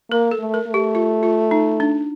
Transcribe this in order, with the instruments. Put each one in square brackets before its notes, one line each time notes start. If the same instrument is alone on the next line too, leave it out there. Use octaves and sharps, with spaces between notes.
[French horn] A#3 [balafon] A#4
[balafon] A4
[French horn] A3
[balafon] A#4
[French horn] A3
[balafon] G4
F4
F4
D#4
D4